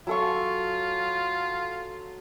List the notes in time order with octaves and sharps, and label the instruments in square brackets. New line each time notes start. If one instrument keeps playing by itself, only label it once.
[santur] F#3 A4 C#6 [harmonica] F4